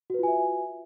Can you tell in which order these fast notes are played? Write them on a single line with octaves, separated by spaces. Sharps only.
F#4 B4 F4 G#5 E5